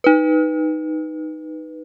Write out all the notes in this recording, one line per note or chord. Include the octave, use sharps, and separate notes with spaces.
D#4 B4